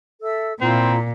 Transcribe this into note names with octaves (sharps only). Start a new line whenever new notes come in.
A4 E5 E6
A#2 C4 E4 F4 A#5